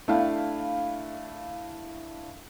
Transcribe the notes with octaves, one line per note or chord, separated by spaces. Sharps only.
A3 D4 E4 F5 G5